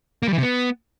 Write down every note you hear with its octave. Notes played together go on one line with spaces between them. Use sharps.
A#3
G3
E3
C3
B3